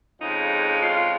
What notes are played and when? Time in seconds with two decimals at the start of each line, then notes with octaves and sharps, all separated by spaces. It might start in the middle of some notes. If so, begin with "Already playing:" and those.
0.21 F2 C#3 G#3 D#4
0.82 F4
0.97 F4